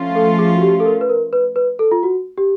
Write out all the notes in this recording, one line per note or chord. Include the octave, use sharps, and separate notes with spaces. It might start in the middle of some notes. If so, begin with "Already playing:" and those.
Already playing: F3 A3 C#4 F4
A4
G#4
F#4
G4
A4
A#4
B4
A#4
B4
B4
A4
F4
F#4
G4